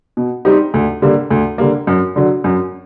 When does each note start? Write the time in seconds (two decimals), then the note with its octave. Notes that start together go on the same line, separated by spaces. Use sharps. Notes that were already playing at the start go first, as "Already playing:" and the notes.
0.17 B2
0.45 G3 C4 D#4 G4
0.74 D2
1.02 D3 G3 A#3
1.31 D2
1.58 D3 G3 A#3
1.87 F#2
2.16 D3 F#3
2.44 F#2